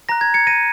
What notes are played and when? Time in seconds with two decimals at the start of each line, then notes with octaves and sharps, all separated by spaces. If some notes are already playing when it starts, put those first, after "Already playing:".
0.09 A#5 F#6 A#6
0.21 G#6
0.34 G#6 C#7
0.47 A#6 D#7